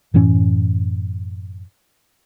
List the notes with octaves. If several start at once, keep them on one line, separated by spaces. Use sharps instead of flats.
F#2 A2 E3 C#4